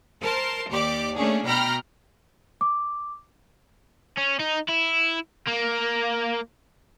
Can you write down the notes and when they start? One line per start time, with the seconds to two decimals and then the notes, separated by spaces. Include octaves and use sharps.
0.22 A#4 C5 A5 C6
0.69 D#2 G4 D5 D6
1.15 A3 A#3 C#4 D4 G#4
1.46 B2 G5 A#5 B5 F6 A#6
2.61 D6
4.17 C#4
4.39 D#4
4.68 E4
5.48 A#3